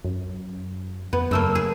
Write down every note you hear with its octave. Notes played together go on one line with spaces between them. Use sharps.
F#2
F2 B3
F#2 C#3 A3 A#3 E6
G#4